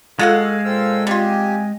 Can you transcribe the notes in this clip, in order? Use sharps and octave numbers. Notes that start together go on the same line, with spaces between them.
G#3 F4 F#4 A4 F5 F#5
A#2 A4 C5 F5 G5 E6
G3 C4 F4 G4 G#5